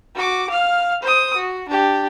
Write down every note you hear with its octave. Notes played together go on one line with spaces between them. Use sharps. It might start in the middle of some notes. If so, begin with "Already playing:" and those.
F#4 D6
F5 F6
C5 D#6
F#4
D4 G4